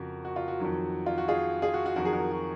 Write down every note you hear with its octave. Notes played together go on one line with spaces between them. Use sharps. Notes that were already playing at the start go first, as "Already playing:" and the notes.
Already playing: F2 C#3 F#4 A#4
F#4
F4
F#4
F2 D#3 F#3
F4
F#4
F4 G#4
F4 G#4
F#4
F#4
F2 D#3 F#3 F#4 A#4
G#4
F#4 A#4
F#4